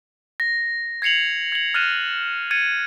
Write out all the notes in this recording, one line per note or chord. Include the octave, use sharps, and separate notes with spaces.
A#6
G#6 C7 C#7 F7 F#7
G#6 F#7
F6 F#6 A6 A#6 D#7 E7
G#6 A6 C#7 D#7